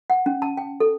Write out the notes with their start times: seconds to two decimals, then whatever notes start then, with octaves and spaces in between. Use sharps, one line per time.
0.10 F#5
0.26 C#4
0.42 A5
0.57 G5
0.80 A4